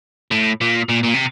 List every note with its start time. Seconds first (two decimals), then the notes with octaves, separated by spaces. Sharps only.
0.31 A2
0.61 A#2
0.89 A#2
1.03 A#2
1.14 C3